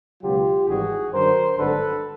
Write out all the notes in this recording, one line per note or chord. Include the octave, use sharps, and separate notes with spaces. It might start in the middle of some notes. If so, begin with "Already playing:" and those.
C#2 B2 F#3 F4 G4
G#1 G#2 E3 G3 F#4 G#4
F#2 D3 F#3 A#4 C5
G#1 G2 D3 F#3 A4 B4